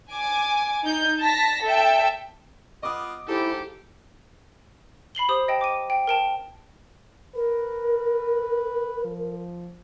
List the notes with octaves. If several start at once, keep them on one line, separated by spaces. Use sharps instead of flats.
G#5 D6
D#4 G6
A5 A#6 B6
A4 E5 G5
B3 F4 D#5 D6 D#6
G#2 E4 G4 A4 C5
B5 C7 F#7 G7
G4 C5 D#6
D#5 G5 A5
D6 D#7
G5
A#4 G5 A5
A#4 B4
F3